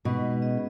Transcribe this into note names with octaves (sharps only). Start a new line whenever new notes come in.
B2 G#3 D#4 B4 D#5
C#4 G#4 B4 D#5